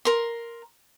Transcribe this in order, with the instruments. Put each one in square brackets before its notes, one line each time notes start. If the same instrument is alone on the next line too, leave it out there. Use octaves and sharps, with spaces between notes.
[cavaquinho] A#4 C6